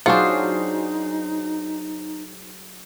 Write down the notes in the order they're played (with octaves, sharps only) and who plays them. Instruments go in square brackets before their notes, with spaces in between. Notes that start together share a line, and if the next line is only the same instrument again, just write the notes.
[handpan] F#3 G#4 C5 [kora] D4 F#4 F#5 [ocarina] D#4 [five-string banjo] F4